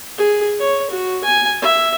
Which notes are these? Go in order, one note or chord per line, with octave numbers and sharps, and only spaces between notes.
G#4
C#5
F#4
G#5
E5